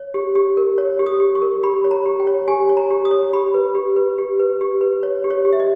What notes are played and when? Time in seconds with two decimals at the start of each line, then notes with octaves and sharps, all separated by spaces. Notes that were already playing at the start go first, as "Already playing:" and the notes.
Already playing: C#5
0.14 G4
0.35 G4
0.57 A#4
0.78 C#5
0.99 G4
1.06 D#6
1.20 G4
1.35 C#6
1.42 A#4
1.63 G4 B5
1.84 C#5
1.91 A#5
2.06 G4
2.20 G5
2.27 C#5
2.48 G4 G#5
2.69 C#5
2.77 A#5
2.91 G4
3.05 D#6
3.11 C#5
3.33 G4 B5
3.54 B4
3.75 G4
3.96 B4
4.18 G4
4.40 B4
4.61 G4
4.81 B4
5.03 C#5
5.24 G4
5.30 C#5
5.45 G4
5.53 E5
5.60 D#5